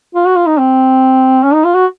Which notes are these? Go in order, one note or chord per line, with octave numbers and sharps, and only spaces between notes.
F4
F#4
F4
D#4
C4
C#4
D#4
F4
F#4